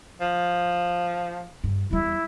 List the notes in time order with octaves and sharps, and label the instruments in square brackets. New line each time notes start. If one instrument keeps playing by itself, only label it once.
[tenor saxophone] F3
[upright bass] G2
[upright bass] E2 G3 [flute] E4